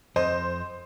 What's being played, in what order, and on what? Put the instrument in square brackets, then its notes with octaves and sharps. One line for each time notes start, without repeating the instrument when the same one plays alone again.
[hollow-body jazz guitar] F2 D#5 [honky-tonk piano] C5